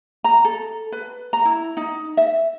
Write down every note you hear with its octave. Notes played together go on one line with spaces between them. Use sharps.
A#5
A4
B4
A#5
E4
D#4
E5